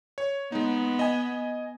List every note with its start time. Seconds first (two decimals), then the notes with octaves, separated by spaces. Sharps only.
0.18 C#5
0.52 G#3 B3 D#4
0.99 D#5 G#5